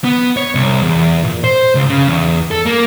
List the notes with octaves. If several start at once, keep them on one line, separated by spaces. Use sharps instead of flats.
B3
C#5
C2
E2
A#2
C5
C#2
C#3
E2
A4
A#3